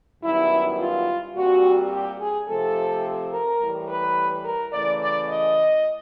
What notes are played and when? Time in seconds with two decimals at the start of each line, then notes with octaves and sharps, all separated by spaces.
0.23 F#2 D#3 G3 B3 E4
0.79 F4
1.35 A#2 G3 C4 F#4
1.92 G4
2.20 G#4
2.48 C3 F3 A3 C4 A4
3.33 A#4
3.60 A2 E3 G3
3.89 B4
4.45 A#4
4.73 C#3 E3 A3 D5
5.01 D5
5.29 D#5